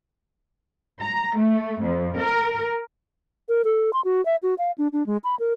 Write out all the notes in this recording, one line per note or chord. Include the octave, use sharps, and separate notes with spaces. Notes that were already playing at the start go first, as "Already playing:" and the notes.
A#5
A3
F2
A#4
A#4
A4
C6
F#4
E5
F#4
F5
D4
D4
G#3
B5
A#4